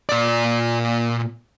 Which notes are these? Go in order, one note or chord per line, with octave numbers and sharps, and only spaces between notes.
A#2 D5